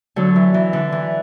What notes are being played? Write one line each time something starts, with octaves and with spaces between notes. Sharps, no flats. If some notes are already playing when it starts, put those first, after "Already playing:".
D3 F#3
E3
E3
D3
E3